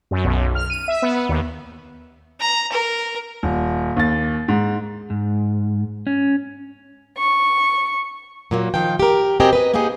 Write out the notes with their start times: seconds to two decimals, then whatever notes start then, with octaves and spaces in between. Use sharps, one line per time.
0.11 F#2
0.25 B1
0.55 F6
0.70 D#7
0.88 E5
1.02 B3
1.29 D#2
2.40 A#5
2.72 A#4
3.43 D#1
3.96 D#2 A6
4.48 G#2
5.10 G#2
6.07 C#4
7.17 C#6
8.51 A#2 F#3 A#3
8.74 D#3 F3 F5 G5
9.00 G4 A#4
9.40 B2 C4 G4 A#4 D#5 G#5
9.53 B4 D#5
9.74 A#3 B3 D#4 G4 G#4